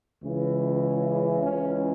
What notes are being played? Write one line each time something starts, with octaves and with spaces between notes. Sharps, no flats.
C#2 C#3 E3
C#2 C#3 E3 C#4